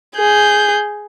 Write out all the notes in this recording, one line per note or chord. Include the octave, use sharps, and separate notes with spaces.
G#4 G6